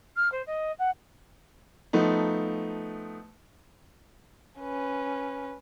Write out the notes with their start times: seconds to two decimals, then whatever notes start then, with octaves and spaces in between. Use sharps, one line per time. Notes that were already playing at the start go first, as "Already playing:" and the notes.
0.16 F6
0.32 C5
0.46 D#5
0.79 F#5
1.93 F3 A3 B3 D#4
4.59 C#4 B4